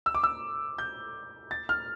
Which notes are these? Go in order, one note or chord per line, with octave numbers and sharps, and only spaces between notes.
E6
D6
E6
G6
A6
F6